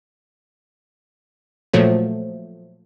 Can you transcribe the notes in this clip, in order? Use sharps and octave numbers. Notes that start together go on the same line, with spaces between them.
A#2 F3 F#3 A3